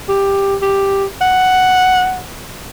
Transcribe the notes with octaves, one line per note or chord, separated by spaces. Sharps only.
G4
G4
F#5